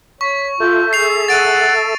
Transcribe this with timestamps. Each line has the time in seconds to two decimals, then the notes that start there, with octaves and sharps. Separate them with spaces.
0.21 C#5 C#6 B6
0.60 F4 A4 E5 A5 G6
0.93 G#4 C7 F7
1.28 F#5 A6 D7 D#7